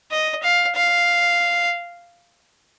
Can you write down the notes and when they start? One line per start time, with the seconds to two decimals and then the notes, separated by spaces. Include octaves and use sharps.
0.11 D#5
0.43 F5
0.76 F5